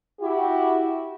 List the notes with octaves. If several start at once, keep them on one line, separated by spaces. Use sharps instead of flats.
E4 F#4 G4